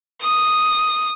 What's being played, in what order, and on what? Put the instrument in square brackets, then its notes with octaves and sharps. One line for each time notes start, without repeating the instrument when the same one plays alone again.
[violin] D#6